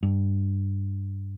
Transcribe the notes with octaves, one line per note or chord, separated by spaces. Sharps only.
G2